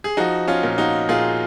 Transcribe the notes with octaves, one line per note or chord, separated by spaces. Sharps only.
G#4
F3 D#4 F#4
C#4 F4
A#2
D#4 F#4
A#2 F4 G#4